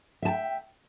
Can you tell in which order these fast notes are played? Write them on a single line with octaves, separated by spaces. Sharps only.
E5 A5 G5